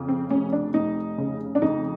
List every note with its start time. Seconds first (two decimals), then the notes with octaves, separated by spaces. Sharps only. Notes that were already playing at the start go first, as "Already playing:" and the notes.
Already playing: F2 C#3
0.08 C4
0.30 F1 C#4
0.53 D4
0.74 F1 D#4
1.18 C#3
1.55 D4
1.62 F2 D#4